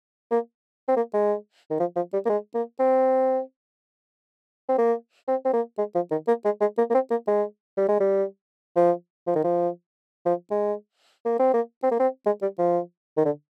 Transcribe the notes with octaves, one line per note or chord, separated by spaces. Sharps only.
A#3
C4
A#3
G#3
D#3
F3
F3
G3
A#3
G#3
A#3
C4
C4
A#3
C4
C4
A#3
G#3
F3
D#3
A#3
G#3
G#3
A#3
A#3
C4
A#3
G#3
G3
G#3
G3
F3
F3
D#3
F3
F3
G#3
A#3
C4
A#3
C4
A#3
C4
G#3
G3
F3
D#3
D3